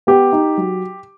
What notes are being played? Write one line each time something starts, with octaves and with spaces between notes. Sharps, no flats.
B3 G4
D#4
F#3